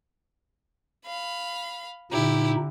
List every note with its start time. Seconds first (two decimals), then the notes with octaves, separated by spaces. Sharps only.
1.06 F5 B5
2.12 A#2 D3 D#4 E4 G4